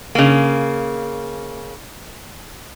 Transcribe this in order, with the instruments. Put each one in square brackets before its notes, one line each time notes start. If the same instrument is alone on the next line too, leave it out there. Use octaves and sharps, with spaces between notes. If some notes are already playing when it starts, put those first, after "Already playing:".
[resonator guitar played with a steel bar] C#3 A#3